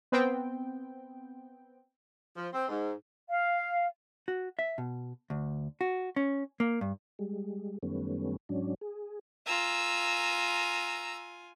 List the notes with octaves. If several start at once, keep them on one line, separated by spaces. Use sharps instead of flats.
B3 C4 G5
F3
C4
G#2
F5
F#4
E5
B2
D2
F#4
C#4
A#3
G2
G3 G#3
F#2 D#3 G3 A3 B3 C#4
G#2 F#3 C#4 D4
G#4
F4 G#5 A#5 E6